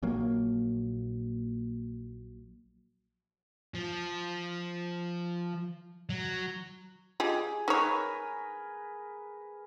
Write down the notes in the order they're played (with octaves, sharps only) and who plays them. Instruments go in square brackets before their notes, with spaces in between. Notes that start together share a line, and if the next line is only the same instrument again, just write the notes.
[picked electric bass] A#1 A#2 F#3 A#3
[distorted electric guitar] F3
F#3
[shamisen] F4 G4 D#5 [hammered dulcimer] G#4
[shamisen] D#4 C#5 [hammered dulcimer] A#4 B4